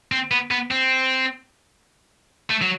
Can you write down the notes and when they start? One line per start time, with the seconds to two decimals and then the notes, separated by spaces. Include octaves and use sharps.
0.12 C4
0.31 B3
0.51 B3
0.71 C4
2.50 A3
2.62 F#3